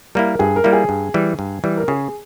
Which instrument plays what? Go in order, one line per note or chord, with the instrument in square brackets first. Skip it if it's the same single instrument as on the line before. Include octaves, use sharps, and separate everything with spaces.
[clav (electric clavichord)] G3 A#3 E4 [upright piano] A#4
[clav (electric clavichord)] G2 [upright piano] G#4
[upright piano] A#4
[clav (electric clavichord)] G3 A#3 E4
[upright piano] G#4
[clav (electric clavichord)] G2
E3 G3
G2
E3 G3
[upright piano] A#4
[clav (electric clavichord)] C#3 [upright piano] G#4